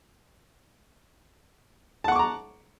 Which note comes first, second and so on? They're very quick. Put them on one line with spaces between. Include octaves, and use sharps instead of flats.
A5 F#5 C#6 D6 A#5